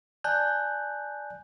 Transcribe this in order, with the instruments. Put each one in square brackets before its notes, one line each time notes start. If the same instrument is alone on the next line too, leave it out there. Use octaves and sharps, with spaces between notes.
[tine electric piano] D5 G#5 A5 F#6 G6